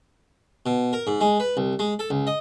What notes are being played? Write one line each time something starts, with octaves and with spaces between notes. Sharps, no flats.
B2
A#4
G#2
G#3
B4
C2
G#3
A4
C#2
D#5